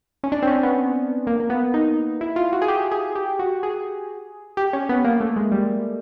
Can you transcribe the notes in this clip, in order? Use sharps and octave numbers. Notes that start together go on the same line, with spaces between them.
C#4
D4
C4
C#4
B3
A#3
A#3
B3
D#4
E4
F4
F#4
G#4
G4
G#4
G4
F#4
G#4
G4
C#4
B3
A#3
A3
G#3
G3